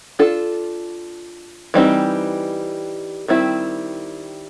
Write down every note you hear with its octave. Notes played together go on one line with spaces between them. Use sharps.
D4 F4 A4
E3 G3 C4 D#4
D#3 G3 C4 E4